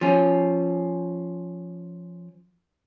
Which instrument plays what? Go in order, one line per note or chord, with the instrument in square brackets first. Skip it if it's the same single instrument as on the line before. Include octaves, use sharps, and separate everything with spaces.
[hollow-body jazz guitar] F3 C#4